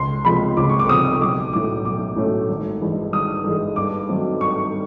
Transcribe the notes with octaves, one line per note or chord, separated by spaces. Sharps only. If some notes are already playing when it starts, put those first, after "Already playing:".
Already playing: C#2 C6
C3 F3 G#3 C4 B5
C#2 D6
C#6
D6
C3 F3 G#3 C4 D#6
B1 D6
A2 F#3 A3 C#4 D6
B1 D6
A2 F#3 A3 C#4
G#1
G2 E3 G#3
G#1 D#6
G2 E3 G#3
G2 D6
D#3 F#3 A3 C4
G2 C#6